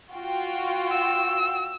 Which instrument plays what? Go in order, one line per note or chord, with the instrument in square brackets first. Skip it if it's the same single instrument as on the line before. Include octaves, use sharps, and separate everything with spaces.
[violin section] F4 F#4 G5
[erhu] E6